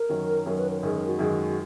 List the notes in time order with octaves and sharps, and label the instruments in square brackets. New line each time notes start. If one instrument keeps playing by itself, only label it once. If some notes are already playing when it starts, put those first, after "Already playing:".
Already playing: [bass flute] A#4
[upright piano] F#2 D#3 F#3
F#2 D#3 F#3
[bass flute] B4
A#4
[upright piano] F#2 D#3 G#3 [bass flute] A#4
[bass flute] A#4
F#4
[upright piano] F#2 D#3 G#3